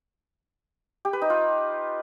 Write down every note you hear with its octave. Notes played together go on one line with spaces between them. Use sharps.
G4
B4
D#4
F4